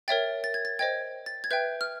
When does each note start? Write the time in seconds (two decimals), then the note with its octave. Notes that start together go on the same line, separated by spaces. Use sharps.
0.08 A#4 C#5 E5 G5 A6
0.44 A6
0.54 G#6
0.65 A6
0.79 C5 D#5 G5 G#6
1.26 A6
1.44 G#6
1.51 B4 E5 G5 G6
1.81 F6